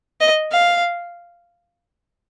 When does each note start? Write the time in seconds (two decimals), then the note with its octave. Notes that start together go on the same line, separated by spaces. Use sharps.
0.20 D#5
0.52 F5